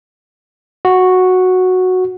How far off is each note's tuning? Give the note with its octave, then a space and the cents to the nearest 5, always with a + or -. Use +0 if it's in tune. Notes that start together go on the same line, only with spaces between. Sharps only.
F#4 -5